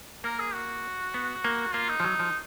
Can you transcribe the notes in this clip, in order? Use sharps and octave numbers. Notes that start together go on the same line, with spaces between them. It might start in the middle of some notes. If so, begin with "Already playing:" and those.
A#3 A#4
G#4
F#4
B3
A#3
A#3 F4
D#4
F3
F#3
F3